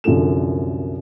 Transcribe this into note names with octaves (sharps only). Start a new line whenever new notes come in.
C2 F#2 D3 F3 A4 E7